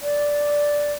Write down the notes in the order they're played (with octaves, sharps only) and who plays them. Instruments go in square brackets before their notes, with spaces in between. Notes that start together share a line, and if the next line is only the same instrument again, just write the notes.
[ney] D5